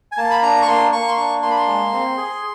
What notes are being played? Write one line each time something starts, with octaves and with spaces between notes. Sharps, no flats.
G#5
A#3 A5
B5
D4 A#5
C#6
A#3 C6
A#3 C#6
C6
D4 C#6
A#3 C6
B5
C6
G#3
C4
G#4